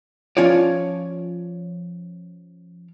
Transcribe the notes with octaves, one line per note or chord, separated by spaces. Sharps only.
F3 C#4 F4 C#5 D5